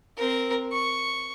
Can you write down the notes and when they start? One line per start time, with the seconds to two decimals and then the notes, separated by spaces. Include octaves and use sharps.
0.17 C4 A#4
0.72 C#6